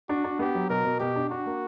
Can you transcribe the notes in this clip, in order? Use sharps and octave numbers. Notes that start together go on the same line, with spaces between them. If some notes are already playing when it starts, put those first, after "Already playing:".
D4 F#4
D4
B3 G4
F#3
B2 A#4
B2
B2 G4
D4
D4 F#4
A#3